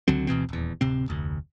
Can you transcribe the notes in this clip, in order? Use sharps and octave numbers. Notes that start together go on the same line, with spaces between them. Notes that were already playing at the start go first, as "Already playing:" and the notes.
C#2 D3 F#3 C4
D2 B2 E3 C4
D#1 E2
D1 C3 C4
F1 D2